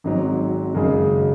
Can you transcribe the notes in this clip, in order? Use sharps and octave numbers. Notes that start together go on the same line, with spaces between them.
G#1 G#2 F#3 C4
G#1 F#2 C#3 G#3